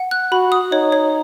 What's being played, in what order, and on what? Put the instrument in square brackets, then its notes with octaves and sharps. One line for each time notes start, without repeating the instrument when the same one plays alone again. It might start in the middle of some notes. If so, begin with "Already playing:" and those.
Already playing: [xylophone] F#5
F#6
[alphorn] F#4 [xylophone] B5
[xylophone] D#6
[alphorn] D#4 [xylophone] C#5
[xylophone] C#5